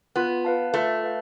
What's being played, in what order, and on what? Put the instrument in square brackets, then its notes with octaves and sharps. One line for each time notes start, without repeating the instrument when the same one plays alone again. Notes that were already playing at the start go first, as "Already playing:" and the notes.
[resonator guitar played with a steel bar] B3 [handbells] F4
[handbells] B4 F5 A5
[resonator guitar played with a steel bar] A3 [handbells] F4
[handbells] B4 F5